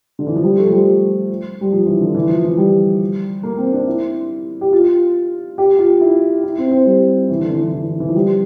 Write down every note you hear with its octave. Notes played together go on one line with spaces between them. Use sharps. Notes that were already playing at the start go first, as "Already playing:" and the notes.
D3
E3
F3
G3
A3
F3
G3
G3
F3
E3
D3
E3
F3
E3
G3
A#3
C4
D4
E4
G4
F4
G4
F4
E4
E4
C4
C4
G3
E3
D3
E3
E3
E3
E3
E3
F3
G3